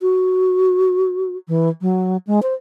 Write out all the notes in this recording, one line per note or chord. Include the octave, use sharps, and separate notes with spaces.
F#4
E3
F#3
G#3
C5